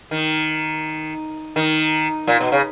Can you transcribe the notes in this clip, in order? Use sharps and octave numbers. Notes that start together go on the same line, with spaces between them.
D#3
D#3
A#2
B2
C#3